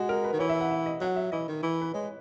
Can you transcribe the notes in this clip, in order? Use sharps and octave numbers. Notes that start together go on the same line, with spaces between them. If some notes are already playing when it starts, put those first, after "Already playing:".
Already playing: G#3 F#4
A#4
B4
D#3
E3 C#5
E5
F#5
E5
D#5
F#3 F#5
E5
E3 D#5
D#3
E3
B4
G#3 C#5